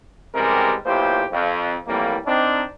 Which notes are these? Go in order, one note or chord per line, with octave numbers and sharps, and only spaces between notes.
C#2 C3 E3 G3 G#3 A#4
B1 A#2 E4 G4 C5
F2
F2 A2 E3 G3 A#3
C4 D4 D#4